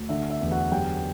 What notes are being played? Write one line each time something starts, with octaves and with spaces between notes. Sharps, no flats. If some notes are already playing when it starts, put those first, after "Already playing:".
Already playing: D2
D3 E5
E5
E2
F#4 F#5
F#2 G4 G5